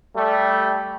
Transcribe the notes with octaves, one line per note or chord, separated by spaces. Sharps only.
G3 A3